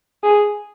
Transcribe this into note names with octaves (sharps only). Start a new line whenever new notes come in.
G#4